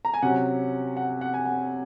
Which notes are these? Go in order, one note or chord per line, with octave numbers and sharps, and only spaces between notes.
A#5
G#5
C3 F#3 C#4 F#5
F#5
F#5
G#5
F#5